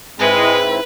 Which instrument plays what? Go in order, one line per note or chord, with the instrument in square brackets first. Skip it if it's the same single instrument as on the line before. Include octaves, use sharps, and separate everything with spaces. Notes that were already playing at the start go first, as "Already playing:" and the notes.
[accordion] G#2 C4 E4 [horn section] G#3 [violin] B4